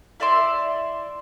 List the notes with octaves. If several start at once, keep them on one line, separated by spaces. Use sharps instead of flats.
E4 D5 E5 C6